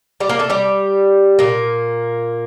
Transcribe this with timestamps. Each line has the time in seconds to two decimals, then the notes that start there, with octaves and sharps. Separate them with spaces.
0.20 G3 G4
0.29 A#3 A#4
0.39 A3 A4
0.50 G3 G4
1.39 A#2 A#3